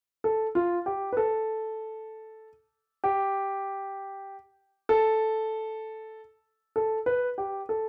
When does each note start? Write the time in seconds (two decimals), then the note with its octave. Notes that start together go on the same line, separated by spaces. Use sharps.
0.24 A4
0.55 F4
0.86 G4
1.13 B4
1.17 A4
3.04 G4
4.89 A4
6.76 A4
7.06 B4
7.38 G4
7.69 A4